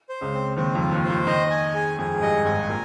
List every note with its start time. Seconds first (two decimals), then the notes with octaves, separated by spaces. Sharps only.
0.09 C5
0.21 C#2 C#3
0.34 C4
0.56 D#2 D#3 C4
0.75 F2 F3
0.80 F4
0.92 D#2 D#3
1.04 C5
1.10 D#2 D#3
1.27 D#2 D#3 D#5
1.50 G#5
1.74 G#4
1.98 F2 G#4
2.14 G#2
2.22 G2 D#5
2.45 G#1 G#2 G#5
2.69 A#2 A#4